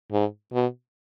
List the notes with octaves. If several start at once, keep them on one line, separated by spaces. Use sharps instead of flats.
G#2
B2